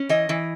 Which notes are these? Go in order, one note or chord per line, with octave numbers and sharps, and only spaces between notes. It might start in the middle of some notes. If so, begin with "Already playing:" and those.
Already playing: C#4
E3 D#5
E3